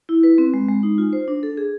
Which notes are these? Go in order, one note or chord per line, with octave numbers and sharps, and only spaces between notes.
E4
B4
C4
G#3
G#3
D#4
F4
C5
D4
A4
G#4